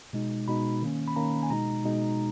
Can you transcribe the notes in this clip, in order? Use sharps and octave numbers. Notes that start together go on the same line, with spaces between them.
B2 G#3 D#4
B2 G#3 D#4 B5
D#3 A#3 C#4
B5
D#3 A#3 C#4 A#5
G#5
B2 G#3 D#4 A#5
B2 G#3 D#4